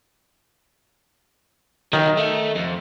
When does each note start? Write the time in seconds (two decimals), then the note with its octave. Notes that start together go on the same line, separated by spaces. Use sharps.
1.93 D#3 F#3 D#4
2.17 A3
2.55 F2